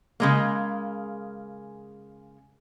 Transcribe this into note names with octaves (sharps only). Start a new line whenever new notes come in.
C#3 G#3 A#3